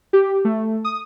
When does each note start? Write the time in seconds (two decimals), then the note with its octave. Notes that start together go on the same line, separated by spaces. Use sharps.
0.13 G4
0.45 A3
0.85 D#6